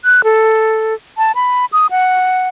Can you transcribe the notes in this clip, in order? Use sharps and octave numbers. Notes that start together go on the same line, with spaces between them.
F#6
A4
A5
B5
D#6
F#5